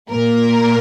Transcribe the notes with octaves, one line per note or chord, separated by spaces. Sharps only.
A#2 A#3 A#4